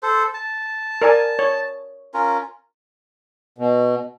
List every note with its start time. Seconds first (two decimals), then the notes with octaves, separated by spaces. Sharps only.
0.03 A4 C5
0.34 A5
1.02 A#4 D5 G#5
1.39 C#5
2.14 C#4 F4 A#4
3.58 B2